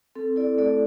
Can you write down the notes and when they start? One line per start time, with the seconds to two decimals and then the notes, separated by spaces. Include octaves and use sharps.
0.15 C4 A4
0.36 E4 A4 D5
0.58 A3 A4 D5